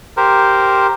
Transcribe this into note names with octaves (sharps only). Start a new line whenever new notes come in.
G4 A#4 C5